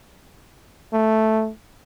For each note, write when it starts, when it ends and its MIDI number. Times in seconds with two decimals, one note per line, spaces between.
0.93 1.50 57